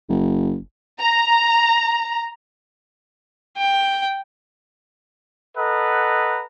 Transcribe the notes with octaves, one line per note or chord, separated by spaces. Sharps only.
F#1
A#5
G5
A4 B4 D#5 F#5 A#5